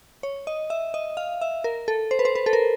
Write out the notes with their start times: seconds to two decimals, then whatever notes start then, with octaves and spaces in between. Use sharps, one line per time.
0.23 C#5
0.47 D#5
0.70 E5
0.94 D#5
1.17 F5
1.41 E5
1.64 A#4
1.88 A4
2.11 C5
2.19 B4
2.25 C5
2.35 B4
2.46 A4
2.53 A#4